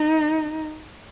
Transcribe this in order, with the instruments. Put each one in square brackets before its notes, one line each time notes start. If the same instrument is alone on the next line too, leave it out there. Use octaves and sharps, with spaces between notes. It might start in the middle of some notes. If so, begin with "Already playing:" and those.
Already playing: [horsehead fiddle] D#4